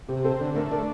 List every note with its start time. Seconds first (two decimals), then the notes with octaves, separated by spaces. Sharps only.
0.08 C3 G4
0.24 C4 A4
0.41 D3
0.56 A3 A#4
0.71 D4 A#4